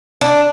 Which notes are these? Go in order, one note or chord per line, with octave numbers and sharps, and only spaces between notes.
D4